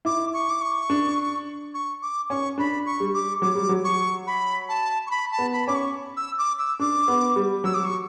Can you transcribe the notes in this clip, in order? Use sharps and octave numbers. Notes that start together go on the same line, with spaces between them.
E4 D6
C#6
D6
C#6
D4
C#6
D6
C#4 C#6
D4 B5
C#6
G3
D6
F#3 D6
G3
F#3
C#6
B5
A5
C#6
B5
A5
B3
B5
C#4 D6
C#6
E6
D6
E6
D4 D6
B3
G3
F#3 E6
D6
C#6